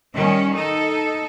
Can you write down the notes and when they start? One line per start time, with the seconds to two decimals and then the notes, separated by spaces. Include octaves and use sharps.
0.14 D#3 G3 C#4
0.55 D#4 A4